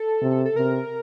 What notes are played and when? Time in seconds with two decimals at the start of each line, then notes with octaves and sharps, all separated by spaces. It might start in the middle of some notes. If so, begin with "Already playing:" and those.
Already playing: A4
0.22 C3
0.45 A4
0.56 C3 A#4